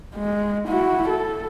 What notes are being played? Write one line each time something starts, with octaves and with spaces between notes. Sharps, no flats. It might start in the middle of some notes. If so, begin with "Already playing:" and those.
G#3
E4 F#4
A4